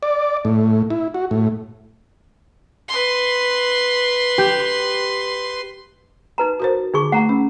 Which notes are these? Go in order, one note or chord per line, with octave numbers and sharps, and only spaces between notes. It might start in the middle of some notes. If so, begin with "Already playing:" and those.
D5
A2
E4
F#4
A2
B4 C6
G4
D#4 B4 A#5
F#4 A#4 C5
D3 D#4 G#4 C#6
A3 F#5 A#5
C#4